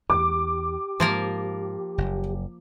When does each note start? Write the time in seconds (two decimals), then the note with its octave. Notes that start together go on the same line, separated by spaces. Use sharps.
0.10 E2 G4 D6
1.00 G#2 F3 A#3 A#4
1.98 F#1